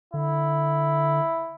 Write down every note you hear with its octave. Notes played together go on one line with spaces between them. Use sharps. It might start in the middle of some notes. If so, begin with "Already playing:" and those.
D3 E4